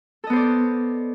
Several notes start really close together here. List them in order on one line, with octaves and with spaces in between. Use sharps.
A4 D#5 B3 C5 D5